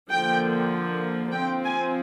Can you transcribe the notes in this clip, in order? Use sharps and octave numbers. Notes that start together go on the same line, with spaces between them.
D3 F3 A#3 G5
F3 C4 G5
G#5